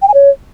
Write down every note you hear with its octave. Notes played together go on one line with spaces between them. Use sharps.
G5
G#5
C#5